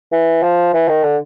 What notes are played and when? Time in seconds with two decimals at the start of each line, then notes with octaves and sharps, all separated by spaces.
0.12 E3
0.43 F3
0.74 E3
0.89 D#3
1.03 D3